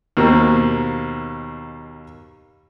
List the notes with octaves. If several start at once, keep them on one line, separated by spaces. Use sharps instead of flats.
D#2 B2 A#3 C4